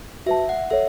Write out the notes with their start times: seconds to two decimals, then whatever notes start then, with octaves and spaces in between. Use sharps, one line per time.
0.26 F#4 B4 E5 A5
0.49 F#5
0.70 A4 C#5 E5